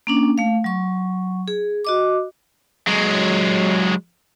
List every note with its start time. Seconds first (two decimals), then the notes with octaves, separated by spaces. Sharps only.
0.07 A#3 C#4 D4
0.38 A3 F5
0.64 F#3 C#6
1.48 G#4
1.85 F#4 D#5 D6
2.88 F#3 G#3